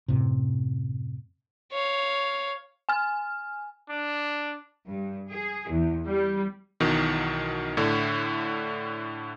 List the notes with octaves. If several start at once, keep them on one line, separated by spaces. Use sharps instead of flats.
F#2 A2 C3
C#5 F5
G#5 F6
D4
G2
G#4
E2
G3
B1 B2 D#3 E3
A2 D3